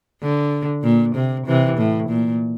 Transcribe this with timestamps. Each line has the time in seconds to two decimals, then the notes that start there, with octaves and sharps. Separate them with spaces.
0.22 D3
0.84 A#2
1.16 C3
1.47 C3 E3
1.78 A2
2.09 A#2